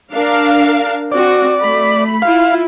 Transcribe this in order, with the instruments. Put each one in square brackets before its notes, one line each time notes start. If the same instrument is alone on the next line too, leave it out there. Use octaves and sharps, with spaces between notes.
[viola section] D4 A#4 F5
[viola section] C4 F#4 [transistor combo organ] D5
[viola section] A3 B5
[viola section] E4 F4 [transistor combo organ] F5